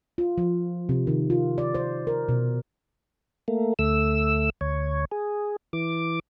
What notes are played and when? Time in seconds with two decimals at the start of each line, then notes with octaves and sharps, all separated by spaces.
0.18 F4
0.38 F3
0.89 C3
1.07 D#3
1.30 F4
1.58 D5
1.75 C5
2.07 A#4
2.29 B2
3.48 A3 A#3
3.79 D2 A3 E6
4.61 D2 C#5
5.12 G#4
5.73 E3 D6